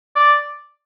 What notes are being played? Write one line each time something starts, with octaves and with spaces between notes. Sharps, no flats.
D5